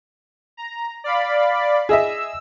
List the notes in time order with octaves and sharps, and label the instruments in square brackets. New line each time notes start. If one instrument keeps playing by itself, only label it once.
[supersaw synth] A#5
D5 F5 B5
[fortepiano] G#4 D#5 E5 [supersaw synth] E6